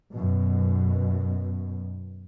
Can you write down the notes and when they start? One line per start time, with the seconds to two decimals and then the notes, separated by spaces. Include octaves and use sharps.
0.15 F#2 B2